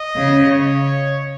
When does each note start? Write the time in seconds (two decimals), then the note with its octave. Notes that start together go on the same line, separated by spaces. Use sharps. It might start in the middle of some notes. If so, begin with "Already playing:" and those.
Already playing: D#5
0.16 C#3
0.51 C#5